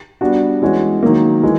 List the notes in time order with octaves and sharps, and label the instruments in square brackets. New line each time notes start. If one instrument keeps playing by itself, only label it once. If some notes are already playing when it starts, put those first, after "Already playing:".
[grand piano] G3 B3 D4 F#4
E3 G#3 C#4 F#4
D#3 F#3 A#3
E3 G#3